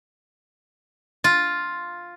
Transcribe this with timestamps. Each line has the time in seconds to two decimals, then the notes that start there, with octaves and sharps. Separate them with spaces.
1.24 F4